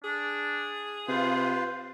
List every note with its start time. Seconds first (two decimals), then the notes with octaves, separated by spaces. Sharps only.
0.04 D4 G#4
1.08 C3 F4 B4 C5 F5